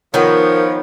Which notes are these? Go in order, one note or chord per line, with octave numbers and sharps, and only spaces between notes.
D#3 F3 B3 A#4 C#5